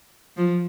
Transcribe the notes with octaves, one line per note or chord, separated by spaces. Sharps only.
F3